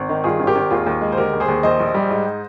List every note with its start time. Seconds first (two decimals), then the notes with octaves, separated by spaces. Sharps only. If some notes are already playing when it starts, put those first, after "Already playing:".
Already playing: G#1
0.09 D#3
0.24 G2 F4 G#4
0.40 G#1
0.47 G4 A#4
0.56 G#1
0.70 D#2 F4 G#4
0.86 D#2
1.02 G#3
1.12 C5
1.17 D3 G4 A#4
1.33 D#2
1.40 G#4 C5
1.48 D#2
1.63 A#1 C5 D#5
1.80 A#1
1.94 G3
2.11 G#2